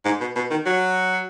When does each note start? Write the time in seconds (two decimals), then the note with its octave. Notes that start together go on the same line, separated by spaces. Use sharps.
0.05 G#2
0.20 B2
0.36 B2
0.50 D#3
0.66 F#3